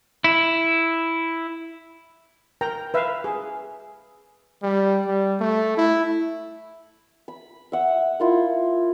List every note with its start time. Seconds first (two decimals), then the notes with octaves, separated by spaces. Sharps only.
0.24 E4
2.61 A#4 G5 A#5
2.94 B4 E5 F5
3.24 G#4
4.63 G3
5.06 G3
5.40 A3
5.78 E4
7.28 B5
7.72 E5 F#5
8.20 E4 F4 A#4